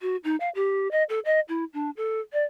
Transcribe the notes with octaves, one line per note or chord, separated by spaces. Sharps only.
F#4
D#4
F5
G4
D#5
A4
D#5
E4
D4
A4
D5